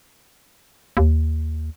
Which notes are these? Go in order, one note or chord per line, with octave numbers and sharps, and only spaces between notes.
D#2